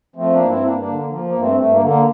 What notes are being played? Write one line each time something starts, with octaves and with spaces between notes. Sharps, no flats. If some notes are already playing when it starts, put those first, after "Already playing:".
F3 A3 C4
A#3 D4
G2
C4 E4
G2 A#3 D4
A#3 D4
D3
A#3
F3 A#3
A#3
G2
A3 C4
G2 A3
A#3
D3
A#3